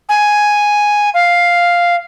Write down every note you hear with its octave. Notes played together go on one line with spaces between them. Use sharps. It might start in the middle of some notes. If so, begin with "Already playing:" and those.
G#5
F5